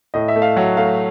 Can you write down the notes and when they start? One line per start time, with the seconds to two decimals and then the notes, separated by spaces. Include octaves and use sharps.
0.14 A2 D#5
0.28 E5
0.36 A3
0.42 F5
0.56 F#3 F#5
0.77 A3 F5